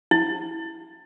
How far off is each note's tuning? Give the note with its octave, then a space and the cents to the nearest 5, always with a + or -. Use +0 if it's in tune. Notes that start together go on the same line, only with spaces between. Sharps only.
E4 -10